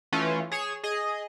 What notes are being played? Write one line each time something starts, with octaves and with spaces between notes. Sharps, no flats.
E3 A3 C#4 F4
G#4 C#5 E7
G#4 D#5